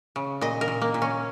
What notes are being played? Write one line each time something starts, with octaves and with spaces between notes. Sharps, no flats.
C#3
A#2 D#5
A#4
A#2
A#3
A#2
C#4